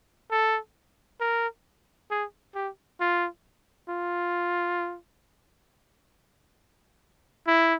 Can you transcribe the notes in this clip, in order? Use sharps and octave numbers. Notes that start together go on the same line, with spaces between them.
A4
A#4
G#4
G4
F4
F4
E4